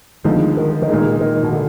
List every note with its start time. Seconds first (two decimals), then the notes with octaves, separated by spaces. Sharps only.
0.24 D2 D3 D#3 F3 G#3
0.57 D#3
0.82 D#3
0.89 A#2 G#3 D#4 G#4
1.21 D#3
1.43 B2
1.53 D3